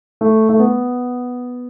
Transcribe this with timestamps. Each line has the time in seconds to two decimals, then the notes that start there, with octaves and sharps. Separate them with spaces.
0.21 A3
0.49 A3
0.59 B3